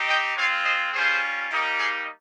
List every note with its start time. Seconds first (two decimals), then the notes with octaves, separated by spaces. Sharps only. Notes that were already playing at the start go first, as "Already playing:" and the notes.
Already playing: C4 D#4 G4
0.08 D#5 G5
0.36 G#3 C4 F4 C#5 F5
0.64 C5 D#5
0.93 G3 C#4 F4 G#4 C5
1.50 G3 A#3 D#4 G4
1.78 G#4